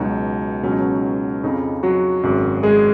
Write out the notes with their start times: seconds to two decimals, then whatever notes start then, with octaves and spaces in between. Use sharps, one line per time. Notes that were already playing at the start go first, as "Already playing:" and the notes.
Already playing: C#2 B2 F#3 D#4
0.63 C#2 B2 F#3 C#4
0.72 D#4
0.79 C#4
1.43 F2 C#3 F3 D#4
1.83 F#3 F#4
2.23 G#1 F#2 C#3 F#3
2.63 G#3 G#4